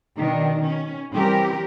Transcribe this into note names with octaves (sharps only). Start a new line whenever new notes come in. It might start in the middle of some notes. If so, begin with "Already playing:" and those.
B2 D#3 D4
C#4
E3 G3 C4 C#4 G4 A#4